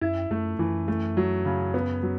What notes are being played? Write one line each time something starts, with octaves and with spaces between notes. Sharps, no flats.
F#2 E4
F#2 A3
F#2 E3
A3
F#3
C#3
B3
F#3